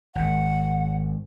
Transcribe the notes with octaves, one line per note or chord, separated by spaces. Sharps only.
G#1 F#5